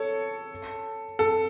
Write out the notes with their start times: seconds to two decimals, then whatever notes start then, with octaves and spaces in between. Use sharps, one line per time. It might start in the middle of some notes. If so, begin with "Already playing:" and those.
Already playing: A4 C#5
1.19 A4